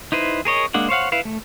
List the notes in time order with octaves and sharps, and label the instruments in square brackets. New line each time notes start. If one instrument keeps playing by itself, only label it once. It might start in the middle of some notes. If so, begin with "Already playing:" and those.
[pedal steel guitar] D#4 E4 B4 C5
G#4 A#4 C#5 D#5
G#3 A#3 D4 F#5
C5 C#5 F5 F#5
E4 B4 F5
A3